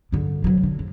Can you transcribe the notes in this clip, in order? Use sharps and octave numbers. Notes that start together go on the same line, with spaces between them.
G2 D3
C3 F#3
D3
F2